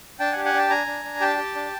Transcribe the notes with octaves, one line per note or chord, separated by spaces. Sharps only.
D4 G5 A5
F#5 G#5
G4
F#5 G#5
D4 G5 A5
D4 G#5 A#5
D4
D4
G4 G5 A5
G4
D4